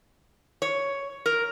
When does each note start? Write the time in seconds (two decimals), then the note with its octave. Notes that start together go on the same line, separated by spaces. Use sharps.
0.62 C#5
1.26 A#4